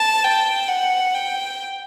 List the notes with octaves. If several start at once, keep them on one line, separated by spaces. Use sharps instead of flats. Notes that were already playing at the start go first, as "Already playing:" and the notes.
Already playing: A5
G5
F#5
G5